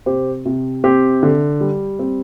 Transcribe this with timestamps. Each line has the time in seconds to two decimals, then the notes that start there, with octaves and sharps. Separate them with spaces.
0.06 C3 G4 C5
0.45 C3
0.84 C4 G4
1.23 D3
1.61 G3
1.99 C4